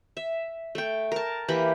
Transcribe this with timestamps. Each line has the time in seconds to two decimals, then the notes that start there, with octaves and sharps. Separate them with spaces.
0.17 E5
0.75 A3 G5
1.12 A#4 A5
1.48 E3 A#3 G4 B5